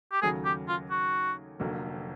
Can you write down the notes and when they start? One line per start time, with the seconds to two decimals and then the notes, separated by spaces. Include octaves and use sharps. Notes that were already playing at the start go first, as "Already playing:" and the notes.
0.12 G4
0.22 D#2 C#3 F#3 A3 G#4
0.45 G4
0.68 F4
0.91 F#4
1.60 F1 F2 D3 F#3 A#3